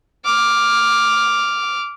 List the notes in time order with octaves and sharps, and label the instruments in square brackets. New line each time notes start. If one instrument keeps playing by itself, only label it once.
[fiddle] D6 F6